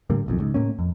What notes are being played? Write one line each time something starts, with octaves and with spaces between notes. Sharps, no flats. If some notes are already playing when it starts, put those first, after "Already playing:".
A2 D3 G3 A#3
D#1 B1 F2
C#2 G#2
A2 A#3 C#4
F2